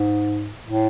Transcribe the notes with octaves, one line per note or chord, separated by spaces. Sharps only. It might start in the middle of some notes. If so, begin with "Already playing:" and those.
Already playing: G#2
A2